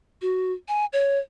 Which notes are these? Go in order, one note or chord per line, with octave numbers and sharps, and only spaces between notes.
F#4
G#5
C#5